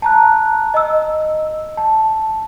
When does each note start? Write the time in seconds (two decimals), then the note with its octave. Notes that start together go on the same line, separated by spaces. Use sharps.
0.02 A5 A#5 F#6
0.74 D#5 E6
1.77 A5